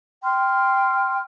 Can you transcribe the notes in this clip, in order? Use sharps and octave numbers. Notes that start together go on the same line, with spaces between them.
G5 C6 F6